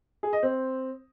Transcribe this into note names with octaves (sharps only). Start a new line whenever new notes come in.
G#4
D#5
C4